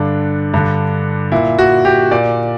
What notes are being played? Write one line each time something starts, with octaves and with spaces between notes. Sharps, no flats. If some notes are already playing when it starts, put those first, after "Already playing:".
Already playing: G2 D3 D4
G2 D3
A#2 E4
F#4
G4
A#2 D5